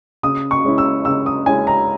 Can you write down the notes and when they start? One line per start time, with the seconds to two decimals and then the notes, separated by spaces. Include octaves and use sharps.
0.23 C#3 D#6
0.51 C#6
0.64 G#3 C#4 E4
0.78 E6
1.05 C#3 E6
1.26 D#6
1.46 G#3 C#4 E4 G#5
1.67 A#5